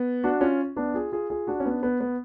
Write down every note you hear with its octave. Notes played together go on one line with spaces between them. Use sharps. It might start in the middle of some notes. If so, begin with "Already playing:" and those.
Already playing: B3
D4 F#4
C#4 F4
B3 D4
F4 G#4
F4 G#4
F4 G#4
D4 F#4
C#4
B3 D4
B3
B3